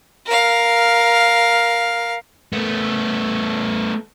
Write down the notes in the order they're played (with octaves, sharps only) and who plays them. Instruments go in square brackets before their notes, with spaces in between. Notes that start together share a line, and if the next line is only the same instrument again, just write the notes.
[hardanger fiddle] A#4 F5
[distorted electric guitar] A3 B3